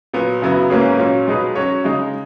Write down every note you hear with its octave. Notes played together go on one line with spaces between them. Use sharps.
A#2 F#3 B3
F#2 C#3 F#3 B3 E4
G#2 E3 A#3 C#4 G#4
A#2 F#3 C#4
B2 G#3 D#4 G#4 B4
F#3 C#4 F#4 C#5
C#3 G#3 D#4